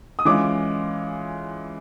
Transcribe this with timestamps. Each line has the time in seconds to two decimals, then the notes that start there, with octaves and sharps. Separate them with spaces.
0.19 D#6
0.25 E3 G#3 C#4 F4 D6